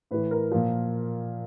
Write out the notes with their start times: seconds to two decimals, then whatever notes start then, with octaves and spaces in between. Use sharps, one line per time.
0.11 A2 E3 B4
0.31 A#4
0.51 A#2 F3